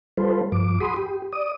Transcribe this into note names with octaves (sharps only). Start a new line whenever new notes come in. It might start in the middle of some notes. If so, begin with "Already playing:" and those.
G3 F4 A4 B4 C5
G2 F3 D6
F#4 G#4 B5 C6 D#6
G4
D5 D#6